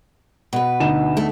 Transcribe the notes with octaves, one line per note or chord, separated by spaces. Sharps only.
B2 B4
D2 D#4 E7
A3